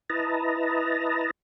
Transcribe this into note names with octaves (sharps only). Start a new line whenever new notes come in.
E4 B4 D#5 A5 A#5